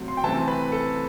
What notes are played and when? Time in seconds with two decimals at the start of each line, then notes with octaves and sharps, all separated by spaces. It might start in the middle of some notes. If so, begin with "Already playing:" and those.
Already playing: C3 F#3 A3 C4
0.08 C6
0.17 G5
0.24 C3 E3 A3 C4 A5
0.48 B4
0.72 A4